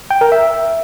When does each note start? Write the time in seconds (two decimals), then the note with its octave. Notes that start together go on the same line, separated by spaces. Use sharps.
0.11 G5
0.21 A#4
0.32 E5